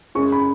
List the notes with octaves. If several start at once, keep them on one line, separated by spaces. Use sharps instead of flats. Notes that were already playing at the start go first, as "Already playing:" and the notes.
F#2 C#3 G#3 C#4 C#6
B5